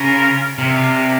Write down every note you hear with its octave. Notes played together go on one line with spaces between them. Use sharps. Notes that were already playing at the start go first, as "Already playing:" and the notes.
Already playing: C#3 C#4 F4 A#4
C3 A#3 D4 F4 A#4